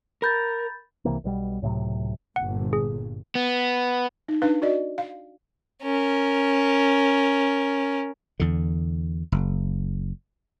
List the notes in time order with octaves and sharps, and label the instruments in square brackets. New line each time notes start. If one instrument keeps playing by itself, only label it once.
[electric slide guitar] A#4 [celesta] B5 G6 A6
[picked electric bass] C2 C3 E3 A#3
B1 B2 G3
C#2 A2 C3 F#3
[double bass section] G1 A#2 [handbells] F#5
[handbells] G#4
[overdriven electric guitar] B3
[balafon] D#4
D4 D#4 B4 F5
F#4 D5 D#5
F5
[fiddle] C#4 A#4
[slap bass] E2 D3
F#1